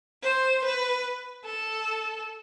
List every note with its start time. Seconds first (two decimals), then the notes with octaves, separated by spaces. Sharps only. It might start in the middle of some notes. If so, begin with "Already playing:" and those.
0.23 C5
0.64 B4
1.46 A4